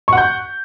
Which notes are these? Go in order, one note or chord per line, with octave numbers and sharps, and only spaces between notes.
F#5 C#6 G6